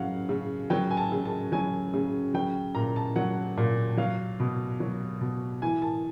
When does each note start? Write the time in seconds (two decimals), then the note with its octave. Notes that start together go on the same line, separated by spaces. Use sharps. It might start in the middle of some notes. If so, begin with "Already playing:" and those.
Already playing: C#3 F#3 F5 F#5
0.29 C#3
0.70 F#3 G5
0.91 G#5
0.97 A5
1.12 C#3
1.25 A5
1.52 F#3 G#5
1.94 C#3
2.34 F#3 G5
2.75 A#2 A#5
2.96 A5
3.16 F#3 F#5
3.57 A#2
3.97 F#3 F5
4.40 B2
4.80 F#3
5.21 B2
5.62 E3 G#5
5.82 A5